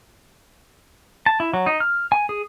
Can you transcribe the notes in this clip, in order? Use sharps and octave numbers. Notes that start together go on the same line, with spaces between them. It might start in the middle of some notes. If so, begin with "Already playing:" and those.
A5
E4
F#3
D#4
F6
G#5
G#4